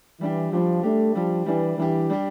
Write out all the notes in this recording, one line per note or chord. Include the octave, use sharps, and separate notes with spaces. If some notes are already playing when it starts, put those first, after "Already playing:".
E3 G3 D4 G4
F3 G3 D4 G4
G3 A3 D4 G4
F3 G3 D4 G4
E3 G3 D4 G4
E3 G3 D4 G4
G3 D4 G4